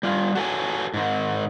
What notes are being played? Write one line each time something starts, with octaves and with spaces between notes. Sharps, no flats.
G3 F4
F#4 A4 C#5 G#5
G#2 D#3